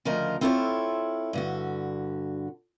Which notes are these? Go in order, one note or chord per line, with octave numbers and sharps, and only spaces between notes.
D2 C#3 F3 A#4 D#5
C4 E4 F4 A4 A#4 C#5
G2 D3 F#4